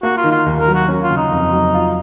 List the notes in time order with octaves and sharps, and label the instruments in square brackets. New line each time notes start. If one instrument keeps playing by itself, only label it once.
[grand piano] A#3 [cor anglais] F#4
[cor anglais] F4
[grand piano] D#3
[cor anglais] F4
[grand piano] D#2
[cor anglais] A#4
[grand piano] F#3
[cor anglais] F#4
[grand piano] C#4
[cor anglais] F4
[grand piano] C#3
[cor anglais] D#4
[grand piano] F2
F#3
F4